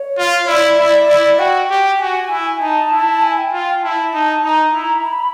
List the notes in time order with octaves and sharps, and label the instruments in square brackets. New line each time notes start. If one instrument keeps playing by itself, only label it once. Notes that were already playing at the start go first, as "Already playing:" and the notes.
Already playing: [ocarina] C#5
[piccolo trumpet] F4
[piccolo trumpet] E4 [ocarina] D5
[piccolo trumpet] E4
E4
[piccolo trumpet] F#4 [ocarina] G5
[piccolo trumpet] G4
[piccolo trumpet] F#4 [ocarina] G#5
[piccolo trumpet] E4
[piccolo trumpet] D#4 [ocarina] A5
[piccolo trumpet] E4
[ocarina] G#5
G5
[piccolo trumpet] F4
[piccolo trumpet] E4 [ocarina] A5
[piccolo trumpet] D#4
[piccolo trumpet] D#4 [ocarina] A#5
[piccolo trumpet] E4
[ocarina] B5